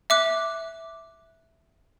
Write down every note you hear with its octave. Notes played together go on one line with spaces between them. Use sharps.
E5 D6 F#6